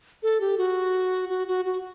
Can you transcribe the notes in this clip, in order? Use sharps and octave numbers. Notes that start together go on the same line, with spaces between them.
A4
G4
F#4
F#4
F#4
F#4